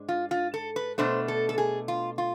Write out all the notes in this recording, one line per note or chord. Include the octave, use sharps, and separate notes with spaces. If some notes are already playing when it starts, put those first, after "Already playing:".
Already playing: G#2 G#3 D4
F4
F4
A4
B4
B2 A3 D4 C5
A4
A4
G#4
F4
F4